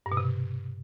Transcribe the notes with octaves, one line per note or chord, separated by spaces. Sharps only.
G2
B2
C3